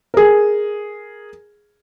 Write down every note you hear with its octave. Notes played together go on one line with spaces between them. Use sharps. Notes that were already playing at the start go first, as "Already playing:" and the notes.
G#4 A#4